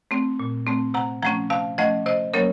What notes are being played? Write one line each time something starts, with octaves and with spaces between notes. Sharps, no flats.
A3 C4
A#2
A3 C4
C3 F#5 A#5
F3 A3 C#4 F#5 A#5
C3 F5 A5
F3 A3 C#4 D#5 F#5
C3 C5 D#5
F#3 A#3 C#4 A#4 C#5